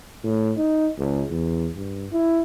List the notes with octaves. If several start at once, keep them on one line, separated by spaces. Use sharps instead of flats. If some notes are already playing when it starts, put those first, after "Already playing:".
A2
D#4
C#2
E2
G2
E4